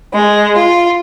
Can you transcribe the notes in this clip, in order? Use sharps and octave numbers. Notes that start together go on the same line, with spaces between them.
G#3
F4